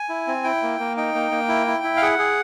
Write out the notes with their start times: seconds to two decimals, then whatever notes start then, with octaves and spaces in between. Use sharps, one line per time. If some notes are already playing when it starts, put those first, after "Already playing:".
Already playing: G#5
0.09 E4
0.27 C4
0.44 E4 G5
0.63 A#3
0.80 A#3
0.97 D#4 G5
1.15 A#3
1.31 A#3
1.49 E4
1.67 E4
1.84 E4
1.97 F5
2.02 G#4 F#5
2.19 G#4